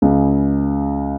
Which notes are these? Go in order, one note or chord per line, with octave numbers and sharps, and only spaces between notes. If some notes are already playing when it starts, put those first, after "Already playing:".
C#2 C#3